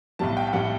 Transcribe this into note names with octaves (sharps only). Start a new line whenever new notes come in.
B1 A2 G3 A5
G5
G5
A2 G3 F#5